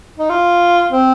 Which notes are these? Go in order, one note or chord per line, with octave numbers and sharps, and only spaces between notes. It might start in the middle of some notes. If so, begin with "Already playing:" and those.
D#4
F4
C4